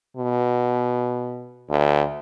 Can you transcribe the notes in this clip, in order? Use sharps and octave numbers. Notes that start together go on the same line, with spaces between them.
B2
D2